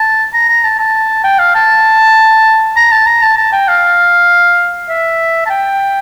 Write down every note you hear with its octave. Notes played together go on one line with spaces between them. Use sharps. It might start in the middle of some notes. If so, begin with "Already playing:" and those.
Already playing: A5
A#5
A#5
A5
A5
G5
F5
A5
A#5
A5
A#5
A5
A5
G5
F5
E5
A5
G5